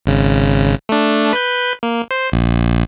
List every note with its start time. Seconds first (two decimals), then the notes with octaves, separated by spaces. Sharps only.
0.06 G#1 C#3
0.89 A3 D4
1.33 B4 G6
1.83 A#3
2.11 C5
2.32 A#1